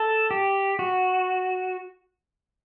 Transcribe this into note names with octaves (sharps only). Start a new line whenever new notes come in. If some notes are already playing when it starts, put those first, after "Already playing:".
Already playing: A4
G4
F#4